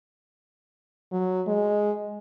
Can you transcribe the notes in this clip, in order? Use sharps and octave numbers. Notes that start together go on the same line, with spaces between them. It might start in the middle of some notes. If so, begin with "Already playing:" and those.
F#3
G#3